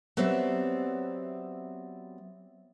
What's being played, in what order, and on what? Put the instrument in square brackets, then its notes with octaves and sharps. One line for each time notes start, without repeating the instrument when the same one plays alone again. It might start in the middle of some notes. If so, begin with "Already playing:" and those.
[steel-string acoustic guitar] F#3 B3 C4 G4 D5 E5